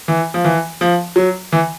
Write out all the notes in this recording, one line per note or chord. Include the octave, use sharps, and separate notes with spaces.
E3
F3
E3
F3
F#3
E3